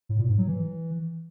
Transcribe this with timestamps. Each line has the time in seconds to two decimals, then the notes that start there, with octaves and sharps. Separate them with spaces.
0.09 A2
0.19 A#2
0.28 G#2
0.38 F#3
0.48 E3